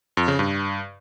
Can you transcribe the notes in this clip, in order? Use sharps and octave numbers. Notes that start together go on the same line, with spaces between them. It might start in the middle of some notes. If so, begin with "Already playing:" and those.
F2
C#3
G2